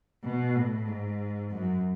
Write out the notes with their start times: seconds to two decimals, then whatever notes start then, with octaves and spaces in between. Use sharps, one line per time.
0.24 B2
0.56 A2
0.87 G#2
1.51 F#2